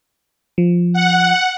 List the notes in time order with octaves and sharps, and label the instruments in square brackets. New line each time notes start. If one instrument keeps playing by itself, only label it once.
[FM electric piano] F3
[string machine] F#5